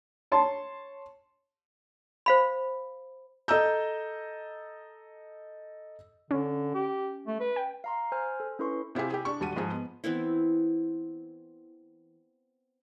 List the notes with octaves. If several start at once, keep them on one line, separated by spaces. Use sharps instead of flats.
C#5 A5 C6
C5 F5 B5
A4 D#5 A#5 E6 G6
D3 C#4
G4
A3
B4
G5
F5 A#5 C6
C5 G#5 C6 F6
A4
C#4 E4 A4 B4 C6 C#6
C3 E4 F4 G4 G#4
G4 G#4
D4 C#6
D#1 G3 F#4 A5 D#7
G#2 F3 G#3 G#4
B3
E3 B3 C4 E4